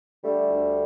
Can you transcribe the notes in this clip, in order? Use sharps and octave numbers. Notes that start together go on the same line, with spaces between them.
D3 G3 A3
D2